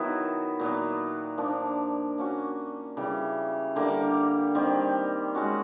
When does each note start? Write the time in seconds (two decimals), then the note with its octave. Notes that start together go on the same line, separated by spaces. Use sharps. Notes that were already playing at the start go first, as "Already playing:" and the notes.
Already playing: D#3 F#3 B3 E4
0.60 A#2 F#3 B3
1.38 F3 A#3 D4
2.18 A#3 C#4 F#4
2.97 C#3 E3 G3
3.76 D3 G3 A#3
4.55 D#3 G3 C4
5.35 G#3 C#4 F#4